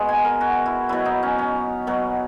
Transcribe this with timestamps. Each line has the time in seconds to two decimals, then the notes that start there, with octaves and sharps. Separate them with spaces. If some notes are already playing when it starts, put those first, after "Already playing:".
Already playing: B2 G#3
0.09 G#5
0.25 A#4
0.41 F#4
0.66 E4
0.89 B2 F#3 E4
1.05 D#4
1.23 C#4
1.38 C#4
1.87 B2 F#3